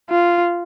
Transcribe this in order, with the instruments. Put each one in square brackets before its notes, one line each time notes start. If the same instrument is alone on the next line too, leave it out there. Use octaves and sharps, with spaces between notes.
[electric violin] F4